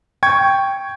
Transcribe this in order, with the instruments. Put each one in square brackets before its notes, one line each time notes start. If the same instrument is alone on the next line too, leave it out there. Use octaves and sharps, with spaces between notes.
[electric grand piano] G5 C#6 G#6